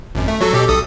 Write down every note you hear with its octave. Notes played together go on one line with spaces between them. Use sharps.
G#1 F#2
A3
F#3 F#4 A4
B2 G4 A4
B1 A4 D#6